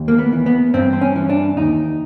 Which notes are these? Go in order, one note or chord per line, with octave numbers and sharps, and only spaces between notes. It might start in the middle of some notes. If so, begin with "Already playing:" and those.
Already playing: D#2
A#3
B3
E3
B3
G2 C4
C4
C#4
E3
D4
D#2 D#4